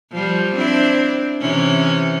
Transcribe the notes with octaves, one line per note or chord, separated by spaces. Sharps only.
F3 G3
C4 D4 E4
C3 E3 C#4